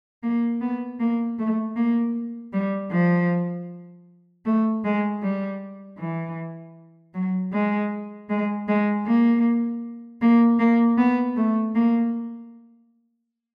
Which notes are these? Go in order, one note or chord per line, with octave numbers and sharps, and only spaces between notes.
A#3
B3
A#3
A3
A#3
G3
F3
A3
G#3
G3
E3
F#3
G#3
G#3
G#3
A#3
A#3
A#3
B3
A3
A#3